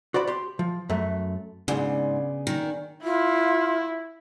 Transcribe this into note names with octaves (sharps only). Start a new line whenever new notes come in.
F#4 C5 D5 B5
G4 C6
F3
F#2 A3
G#2 C#3 B3 D4 G#4
D#3
E4 F4